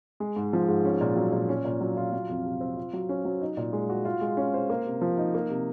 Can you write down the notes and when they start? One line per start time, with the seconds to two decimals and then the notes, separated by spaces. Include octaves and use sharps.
0.20 G#3
0.36 G#2
0.53 F3
0.68 G#2
0.85 C#4
1.01 A#2
1.16 F#3
1.33 A#2
1.49 C#4
1.65 A#2
1.81 F#3
1.97 F4
2.13 F#3
2.30 F2
2.45 C3
2.61 C4
2.77 F4
2.93 F#3
3.09 C#4
3.25 F#3
3.41 D#4
3.57 A#2
3.73 G#3
3.90 F#4
4.05 F4
4.21 G#3
4.37 C#4
4.54 C5
4.70 A#3
4.86 C3
5.02 F3
5.17 D#4
5.34 A#3
5.50 C3